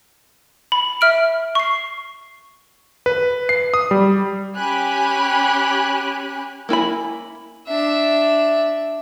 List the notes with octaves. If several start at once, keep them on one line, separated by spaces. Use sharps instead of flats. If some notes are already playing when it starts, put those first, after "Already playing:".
B5
E5 F6 D7
C#6 C7
B4
C7
D#6
G3
C#4 G4 G#5 B5 F#6
A#3 E4 G#5 B5
D4 E5